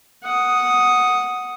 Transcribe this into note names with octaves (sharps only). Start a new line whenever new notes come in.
F#5 D#6